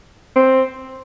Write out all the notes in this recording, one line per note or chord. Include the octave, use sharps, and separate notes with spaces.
C4